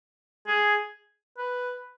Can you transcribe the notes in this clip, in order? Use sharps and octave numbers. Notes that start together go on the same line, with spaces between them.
G#4
B4